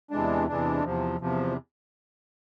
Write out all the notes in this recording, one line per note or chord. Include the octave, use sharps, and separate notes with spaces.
E2 C3 E3 G#3 D4
E2 C3 E3 G#3 D4
E2 C3 F3
E2 C3 F3